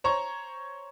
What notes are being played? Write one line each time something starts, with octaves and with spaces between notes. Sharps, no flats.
C5 C#5 A#5 C#6